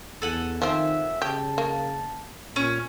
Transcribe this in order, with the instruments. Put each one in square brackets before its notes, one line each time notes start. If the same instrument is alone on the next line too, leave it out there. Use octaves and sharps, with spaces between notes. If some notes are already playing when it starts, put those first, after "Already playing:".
[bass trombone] E2 [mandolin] A4 F#5 G#5
[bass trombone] D#3 [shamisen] F3 C4 [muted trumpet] E5
[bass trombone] C#3 [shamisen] G4 [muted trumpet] A5
[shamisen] A#3
[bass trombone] A#2 [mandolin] C#4